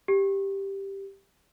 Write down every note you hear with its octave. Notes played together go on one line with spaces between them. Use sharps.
G4